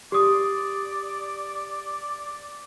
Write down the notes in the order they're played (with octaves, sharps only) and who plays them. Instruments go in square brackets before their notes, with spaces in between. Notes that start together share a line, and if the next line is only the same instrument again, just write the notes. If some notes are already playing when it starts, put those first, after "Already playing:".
[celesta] G4 D#6 [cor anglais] D5